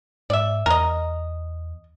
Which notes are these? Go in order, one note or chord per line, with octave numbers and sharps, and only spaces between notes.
G#2 D5 E5
E2 A#4 D#5